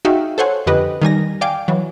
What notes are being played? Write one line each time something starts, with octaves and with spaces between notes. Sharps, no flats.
D#4 F#4 G#4 E5 F5 G5
A4 C5 C#5 F#5 G#5
F2 D3 G4 B4 D#5 F#6
D#3 G3 G#5 A#6
D5 F5 G5 G#5 D6
E3 F#3